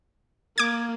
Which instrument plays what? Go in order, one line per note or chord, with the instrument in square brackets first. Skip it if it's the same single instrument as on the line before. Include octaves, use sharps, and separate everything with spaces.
[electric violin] A#3 [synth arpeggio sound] D6 G#6